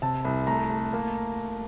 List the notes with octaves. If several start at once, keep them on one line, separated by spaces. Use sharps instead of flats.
C3 A5
C2
A3 A#5
A3
A#3